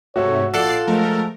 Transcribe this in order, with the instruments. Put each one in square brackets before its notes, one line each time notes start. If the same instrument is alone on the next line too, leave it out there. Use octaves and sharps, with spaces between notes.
[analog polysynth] G#2 C3 A3 [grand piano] F#4 E5 E6 [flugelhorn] C#5
[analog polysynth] A#1 D5 C7 [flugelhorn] F4 [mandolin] A4 F#5
[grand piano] F3 G#3 [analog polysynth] A3 A#4